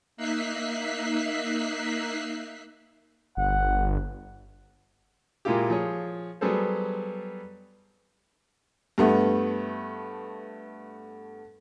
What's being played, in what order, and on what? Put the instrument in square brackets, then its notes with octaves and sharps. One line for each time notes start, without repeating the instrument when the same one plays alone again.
[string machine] A#3 D#4 E5 F#6 B6 C7
[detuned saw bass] G1 [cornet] F#5
[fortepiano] A#2 G#3 A#3 E4 F4 G4
F3 G#4 C#5
F#3 G3 B3 G#4 A4 C5
[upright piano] G2 A3 B3